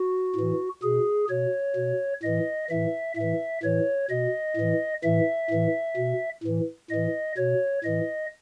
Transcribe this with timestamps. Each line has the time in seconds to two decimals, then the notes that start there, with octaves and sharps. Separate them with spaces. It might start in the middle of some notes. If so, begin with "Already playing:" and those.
Already playing: F#4
0.36 A2 E3
0.83 B2 G#4
1.29 B2 C#5
1.76 B2
2.23 A2 E3 D#5
2.70 A2 E3 E5
3.16 A2 E5
3.22 E3
3.63 A2 E3 C#5
4.10 B2 D#5
4.57 A2 E3
5.03 A2 E3 E5
5.51 A2 E3
5.96 B2
6.44 A2 E3
6.91 A2 E3 D#5
7.37 B2 C#5
7.84 A2 E3 D#5